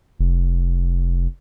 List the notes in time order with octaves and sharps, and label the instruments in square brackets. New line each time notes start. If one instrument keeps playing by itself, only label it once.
[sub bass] F1